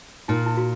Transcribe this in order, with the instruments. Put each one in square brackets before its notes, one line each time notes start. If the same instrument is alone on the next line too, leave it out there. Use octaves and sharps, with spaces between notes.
[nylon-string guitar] A#2 [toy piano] D#4
[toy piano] E4
F#4